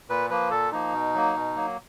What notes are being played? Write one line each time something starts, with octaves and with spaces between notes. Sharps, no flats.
A#2 B4
F3 A#3 B4
A#2 A4
F3 A#3 D#4
B2
F#3 A#3
B2
F#3 A#3